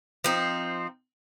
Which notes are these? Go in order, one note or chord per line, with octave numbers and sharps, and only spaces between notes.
F3 C4 D#4